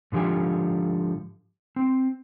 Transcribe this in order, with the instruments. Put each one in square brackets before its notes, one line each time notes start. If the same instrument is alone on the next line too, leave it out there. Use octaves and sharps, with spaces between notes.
[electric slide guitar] G#2 D3 F3 G4 G#5
C4